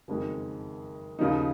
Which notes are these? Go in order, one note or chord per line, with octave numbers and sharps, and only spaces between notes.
F#1 F2 D#3 G#3
D#2 C#3 F3 A#3 D#4